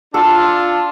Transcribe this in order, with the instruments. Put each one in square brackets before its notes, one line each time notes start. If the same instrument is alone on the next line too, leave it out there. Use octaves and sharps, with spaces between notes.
[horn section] D4 F4 [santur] A4